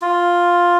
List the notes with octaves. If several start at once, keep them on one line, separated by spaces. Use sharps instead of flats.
F4